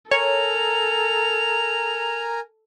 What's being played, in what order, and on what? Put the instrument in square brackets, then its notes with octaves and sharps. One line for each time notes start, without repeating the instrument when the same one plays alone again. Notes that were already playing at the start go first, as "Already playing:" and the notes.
[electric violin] A4 [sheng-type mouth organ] A#4 G#5 A#5 [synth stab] C#5 [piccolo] F7